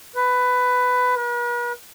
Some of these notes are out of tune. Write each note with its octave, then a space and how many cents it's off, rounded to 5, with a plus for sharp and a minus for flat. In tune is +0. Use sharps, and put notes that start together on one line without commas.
B4 +15
B4 -45